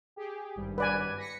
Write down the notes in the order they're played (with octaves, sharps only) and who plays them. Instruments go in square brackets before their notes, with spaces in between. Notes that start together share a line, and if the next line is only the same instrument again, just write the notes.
[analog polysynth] G4 G#4
G#1 G2 G3
[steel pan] B4 D5 G#5
[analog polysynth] A#6 B6 C#7